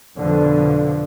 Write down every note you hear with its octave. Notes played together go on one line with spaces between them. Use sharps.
F2 B2 D3 F3